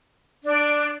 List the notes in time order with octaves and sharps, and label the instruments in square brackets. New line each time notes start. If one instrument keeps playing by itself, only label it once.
[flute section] D4